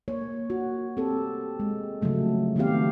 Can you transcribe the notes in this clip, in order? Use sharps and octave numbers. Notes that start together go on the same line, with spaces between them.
A#3 C#5
F#4
C4 G4 A4
G#3
C#3 F3 F#3 A3 C#4
D#3 A3 B3 C4 G4 F5